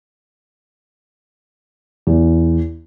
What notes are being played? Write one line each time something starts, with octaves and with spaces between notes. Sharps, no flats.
E2